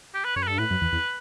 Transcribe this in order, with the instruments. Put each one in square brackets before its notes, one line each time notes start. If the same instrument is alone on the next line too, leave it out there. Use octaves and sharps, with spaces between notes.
[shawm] G4
B4
[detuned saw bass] F#2 [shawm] C#5
[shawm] B4
[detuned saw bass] G2 [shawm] A4
[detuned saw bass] A2 [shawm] B4
[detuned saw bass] F#2
E2
E2